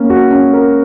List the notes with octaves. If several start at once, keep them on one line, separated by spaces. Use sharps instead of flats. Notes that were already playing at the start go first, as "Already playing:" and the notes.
Already playing: A#3 C#4 A#4
F#4
C#4
A#4